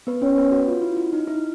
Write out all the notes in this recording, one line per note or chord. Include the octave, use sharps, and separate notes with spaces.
B3 B4
C#4 C#5
B3 B4
F#4
F4
E4
E4
D#4
E4